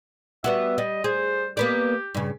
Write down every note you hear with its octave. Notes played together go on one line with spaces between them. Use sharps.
G3 B3 F#4 E5
G3 D#5
G#4 C5
A#3 B3 G4 D5
G2 C#3